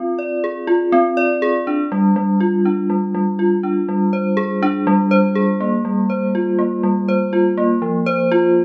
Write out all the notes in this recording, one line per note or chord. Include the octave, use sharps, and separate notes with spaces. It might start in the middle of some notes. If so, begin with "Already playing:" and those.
Already playing: C4 F4
D5
G#4
F4
C4
D5
G#4
D4
G3
G3
F4
D4
G3
G3
F4
D4
G3
C5
G#4
D4
G3
C5
G#4
A#3
G3
C5
F4
A#3
G3
C5
F4
A#3
F3
C5
F4